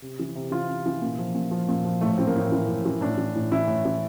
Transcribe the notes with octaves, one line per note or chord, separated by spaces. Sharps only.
C3
E3
C3
E3 F4
C3
E3
A#2
F3
A#2
F3
A#2
F3
A2 A3
E3 C4
A#3
A2
E3
A2
E3
A2 D4
E3
A2
E3 E4
A2
E3